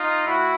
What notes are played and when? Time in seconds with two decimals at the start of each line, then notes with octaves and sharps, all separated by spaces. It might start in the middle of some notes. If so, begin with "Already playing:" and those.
Already playing: D#4 F4
0.26 A2 E4 F#4